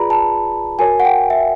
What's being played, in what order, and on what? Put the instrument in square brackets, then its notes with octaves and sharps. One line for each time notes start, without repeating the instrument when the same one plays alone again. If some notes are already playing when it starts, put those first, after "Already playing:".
Already playing: [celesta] F4 G#4 B4 D5 A#5 B5
A5
F#4 A#4 C#5 G#5
F#5
G5
E5